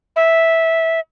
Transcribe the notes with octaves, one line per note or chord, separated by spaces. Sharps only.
E5